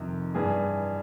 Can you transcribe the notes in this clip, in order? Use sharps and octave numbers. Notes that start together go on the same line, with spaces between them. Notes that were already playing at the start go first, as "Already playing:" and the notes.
Already playing: F2 C3 D#3
G2 E3 G#4